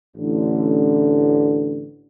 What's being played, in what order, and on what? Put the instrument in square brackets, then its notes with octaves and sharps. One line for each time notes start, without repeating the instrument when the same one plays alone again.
[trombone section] A1 D3